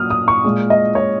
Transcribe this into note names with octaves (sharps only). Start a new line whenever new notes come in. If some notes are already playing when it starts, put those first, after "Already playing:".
Already playing: A#2 F#3 D#6 F6
D#6
C#6
A#2 G#3
D#5
C#5